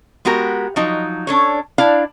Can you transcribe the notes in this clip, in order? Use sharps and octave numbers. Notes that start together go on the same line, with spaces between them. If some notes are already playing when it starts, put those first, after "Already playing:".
G#3 B3 F#4 G4 A#4
F3 F#3 D#4
C#4 D4 A4 C#5
D4 E4 D5 F5